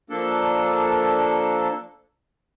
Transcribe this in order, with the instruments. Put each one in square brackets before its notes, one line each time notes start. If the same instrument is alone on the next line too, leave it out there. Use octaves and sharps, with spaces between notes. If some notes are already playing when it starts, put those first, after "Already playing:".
[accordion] F3 A#3 D4 A4